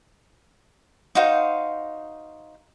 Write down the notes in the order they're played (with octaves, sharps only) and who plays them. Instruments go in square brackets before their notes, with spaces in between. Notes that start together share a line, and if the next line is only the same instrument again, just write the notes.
[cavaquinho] D#4 F#4 C5 F5